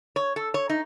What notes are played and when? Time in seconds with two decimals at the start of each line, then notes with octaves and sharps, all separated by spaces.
0.16 C#5
0.36 A4
0.54 C#5
0.69 D#4